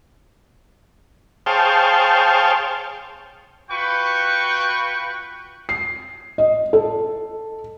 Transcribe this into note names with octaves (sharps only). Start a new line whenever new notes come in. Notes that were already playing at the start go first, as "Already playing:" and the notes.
G#4 C5 C#5 F5 G5 A5
F4 F#4 B4 G5 C#6
C7
D#5
A4